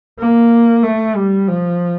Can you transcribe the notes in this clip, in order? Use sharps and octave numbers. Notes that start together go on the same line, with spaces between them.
A#3
A3
G3
F3